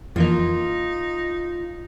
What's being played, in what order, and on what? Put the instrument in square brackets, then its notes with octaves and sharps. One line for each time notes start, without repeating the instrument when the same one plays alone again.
[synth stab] F2 E3 A#3 [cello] D#4 [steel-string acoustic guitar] F4